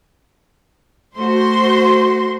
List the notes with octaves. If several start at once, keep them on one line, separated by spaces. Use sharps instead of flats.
A3 F#4 C5 C6